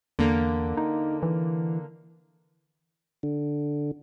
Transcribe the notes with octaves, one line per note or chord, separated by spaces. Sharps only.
E2 D3 A#3
D#4
E3
D3